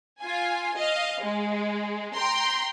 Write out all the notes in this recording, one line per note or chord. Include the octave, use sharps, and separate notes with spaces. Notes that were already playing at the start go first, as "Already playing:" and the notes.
F4 G#5
D#5 F5
G#3
G5 A#5 C6